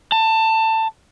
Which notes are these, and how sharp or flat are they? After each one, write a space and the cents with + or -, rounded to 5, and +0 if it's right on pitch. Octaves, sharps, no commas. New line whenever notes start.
A5 +20